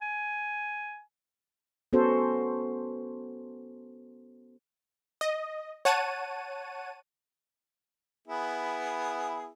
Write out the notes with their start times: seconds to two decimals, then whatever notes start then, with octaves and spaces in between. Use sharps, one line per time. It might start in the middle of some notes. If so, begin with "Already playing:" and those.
0.02 G#5
1.93 B3 C#4 F#4 A4 C5
5.21 D#5
5.85 C#5 F#5 A5 D#7
8.27 B3 E4 G#4